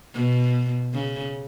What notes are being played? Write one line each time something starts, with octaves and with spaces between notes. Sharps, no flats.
B2
C#3